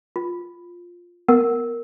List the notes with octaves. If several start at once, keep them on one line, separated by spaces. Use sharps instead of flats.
F4
B3 A#4